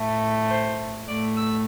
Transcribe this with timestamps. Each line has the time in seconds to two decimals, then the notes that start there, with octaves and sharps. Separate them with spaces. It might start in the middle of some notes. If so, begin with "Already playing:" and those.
Already playing: A2 A3
0.50 C5
1.07 A2 A3 D5
1.36 E6